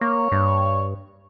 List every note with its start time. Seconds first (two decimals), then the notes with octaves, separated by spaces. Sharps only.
0.01 A#3 C#5
0.32 G2